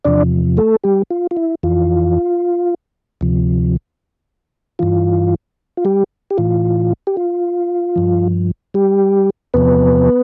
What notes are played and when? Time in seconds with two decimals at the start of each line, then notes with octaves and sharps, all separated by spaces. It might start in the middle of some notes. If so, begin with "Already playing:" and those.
0.05 E2 C3 F3 D4 D5
0.57 A3 A4
0.84 G3 G4
1.11 F4
1.31 F4
1.37 E4
1.63 F2 E3 F4
3.21 D2 C3 F3
4.79 G2 E3 F4
5.77 F4
5.85 G3 G4
6.30 G4
6.38 A2 E3 F4
7.07 G4
7.17 F4
7.96 G2 F3
8.74 G3 G4
9.54 E2 C3 F3 B3 B4